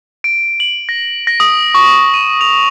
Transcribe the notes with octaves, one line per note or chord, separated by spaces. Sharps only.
D7
F#7
A#6
A#6
D#6
C#6
D#7
F7